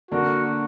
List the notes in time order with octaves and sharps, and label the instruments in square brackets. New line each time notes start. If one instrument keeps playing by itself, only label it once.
[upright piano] D3 A#3 D4 A#4 [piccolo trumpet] F#4